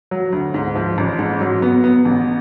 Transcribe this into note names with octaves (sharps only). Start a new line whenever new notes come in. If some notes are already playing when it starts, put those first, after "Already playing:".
F#3
D2
G#2
F3
A1
G#2
F#3
B3
B3
A1